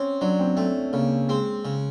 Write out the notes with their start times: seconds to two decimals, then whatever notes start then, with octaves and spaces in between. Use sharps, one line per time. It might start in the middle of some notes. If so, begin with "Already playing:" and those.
Already playing: C4 C#4
0.21 F#3 D4
0.39 C4
0.57 A3 C4
0.93 C#3 A#3
1.29 G#3 C4
1.65 C#3